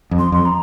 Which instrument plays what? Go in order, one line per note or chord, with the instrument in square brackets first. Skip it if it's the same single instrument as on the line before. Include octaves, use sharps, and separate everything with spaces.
[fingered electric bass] F2
[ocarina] C6
[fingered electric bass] F2 [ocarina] C6
[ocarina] A#5